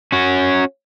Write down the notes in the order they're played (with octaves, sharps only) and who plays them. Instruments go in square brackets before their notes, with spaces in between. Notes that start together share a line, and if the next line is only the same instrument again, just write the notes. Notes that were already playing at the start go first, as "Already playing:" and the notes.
[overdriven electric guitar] C#4 F#4